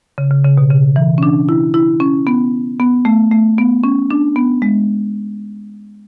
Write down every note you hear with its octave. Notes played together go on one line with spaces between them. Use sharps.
C#3
C#3
C#3
B2
C#3
E3
C#4
D4
E4
E4
C#4
B3
B3
A3
A3
B3
C#4
D4
B3
G#3